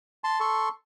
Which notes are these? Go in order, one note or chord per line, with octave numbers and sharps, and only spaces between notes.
A5 C6
A4 C6 C#6